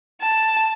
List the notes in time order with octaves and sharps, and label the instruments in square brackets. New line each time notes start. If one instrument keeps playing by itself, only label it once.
[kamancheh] A5